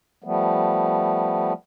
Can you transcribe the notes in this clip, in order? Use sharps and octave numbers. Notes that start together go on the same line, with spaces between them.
F3 G3 A3 B3